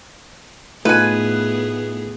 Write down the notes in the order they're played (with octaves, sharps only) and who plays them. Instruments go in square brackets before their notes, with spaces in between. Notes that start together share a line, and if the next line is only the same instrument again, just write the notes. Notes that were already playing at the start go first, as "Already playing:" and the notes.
[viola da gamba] A2 B3 G#4 [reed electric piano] A3 D#4 F4 [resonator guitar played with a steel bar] B4 G#5